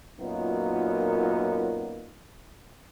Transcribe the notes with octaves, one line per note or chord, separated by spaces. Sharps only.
F#2 A#2 F#3 B3 D#4 F4